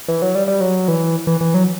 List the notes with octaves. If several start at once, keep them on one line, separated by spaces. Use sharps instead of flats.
E3
F#3
G3
G3
F#3
E3
E3
E3
F#3